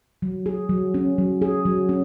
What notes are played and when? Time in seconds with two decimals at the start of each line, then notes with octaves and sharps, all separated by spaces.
0.22 F#3
0.46 G#4
0.69 F#3
0.94 C#4
1.18 F#3
1.42 G#4
1.65 F#3
1.89 C#4